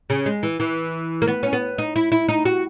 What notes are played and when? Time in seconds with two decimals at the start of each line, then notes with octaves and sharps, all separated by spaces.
0.10 C#3
0.26 G#3
0.43 E3
0.60 E3
1.22 A#3
1.28 B3
1.43 C#4
1.53 B3
1.78 D#4
1.96 E4
2.12 E4
2.29 D#4
2.45 F#4